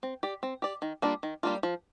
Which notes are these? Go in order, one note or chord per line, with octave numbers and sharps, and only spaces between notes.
C4
G4 D5
C4
G4 D5
D#3
G3 A#3 D4 F4
D#3
G3 A#3 D4 F4
F3